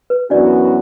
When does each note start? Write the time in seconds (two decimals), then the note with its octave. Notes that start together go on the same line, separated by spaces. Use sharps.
0.10 B4
0.30 F#2 E3 B3 D4 F#4 D5